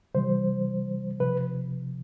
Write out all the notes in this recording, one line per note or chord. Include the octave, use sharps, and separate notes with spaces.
C3 E3 G3 C5
C3 F3 B4